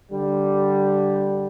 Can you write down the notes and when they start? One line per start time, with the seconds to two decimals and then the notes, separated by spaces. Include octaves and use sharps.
0.12 D3 G3